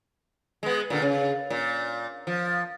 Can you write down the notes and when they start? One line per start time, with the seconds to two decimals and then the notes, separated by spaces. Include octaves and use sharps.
0.63 G#3 B3
0.90 A#2 D3
1.02 C#3
1.50 A#2
2.27 F3